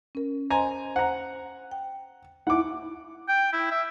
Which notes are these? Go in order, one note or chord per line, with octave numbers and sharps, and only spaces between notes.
C#4 A#4
C5 D#5 G#5 A#5 C6
C5 F#5 A#5
G5
E4 F#5 D6
G5
E4
E5